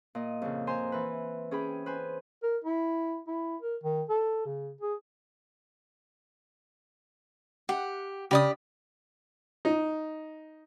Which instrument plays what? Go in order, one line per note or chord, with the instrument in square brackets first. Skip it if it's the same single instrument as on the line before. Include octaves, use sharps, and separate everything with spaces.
[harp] A#2 D#5
F2 C#3
C5 G#5 A#5 C6
E3 B4
C#4 G#4 G5 B5
B4 C5 G#5
[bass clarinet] A#4
E4
E4
A#4
D#3
A4
C#3
G#4
[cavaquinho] G4 [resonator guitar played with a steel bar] F#5
[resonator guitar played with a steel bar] C#3 [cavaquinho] G4 D5 D#6
[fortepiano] D#4